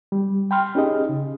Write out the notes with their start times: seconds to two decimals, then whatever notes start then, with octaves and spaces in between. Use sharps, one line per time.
0.12 G3
0.51 G5 B5 C6 F6
0.75 C#4 D#4 G4 G#4 D#5
1.09 C#3